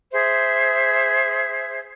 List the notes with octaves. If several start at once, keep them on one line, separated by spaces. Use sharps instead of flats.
G#4 C5 E5